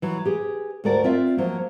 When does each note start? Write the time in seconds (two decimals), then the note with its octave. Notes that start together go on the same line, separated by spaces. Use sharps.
0.02 E3 F#3
0.25 G4 G#4 B4
0.84 D2 G#2 A3 F#4 A#4 D5
1.04 C4 F4 D5 E5
1.37 F3 F#3 A#3